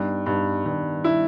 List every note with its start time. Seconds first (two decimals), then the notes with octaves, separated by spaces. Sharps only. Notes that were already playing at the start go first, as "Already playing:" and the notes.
Already playing: G2 B3 D#4
0.26 G2 B3 D#4
0.65 G2 D#3 G3
1.04 E4